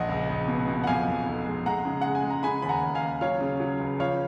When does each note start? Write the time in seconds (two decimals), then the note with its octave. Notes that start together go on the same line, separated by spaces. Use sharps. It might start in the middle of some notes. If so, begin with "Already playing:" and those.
Already playing: A#1 D#5 F#5
0.09 C#2
0.30 C#2
0.48 B2
0.68 B2
0.83 F#5
0.87 F2 F5 G#5
1.08 F2
1.26 F1
1.46 G#3
1.66 G#3 F#5 A#5
1.85 C#3
2.01 G#3 F#5
2.15 G#5
2.24 G#3
2.30 A#5
2.43 C#3 G#5 B5
2.62 D#2 B5
2.69 F#5 A#5
2.83 D#2
2.95 F5 G#5
3.02 D#2
3.21 F#3 C#5 F5
3.41 C#3
3.60 F#3
3.79 C#2
3.99 F3 C#5 F5